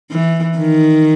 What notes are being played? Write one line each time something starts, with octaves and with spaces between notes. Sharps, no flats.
E3
D#3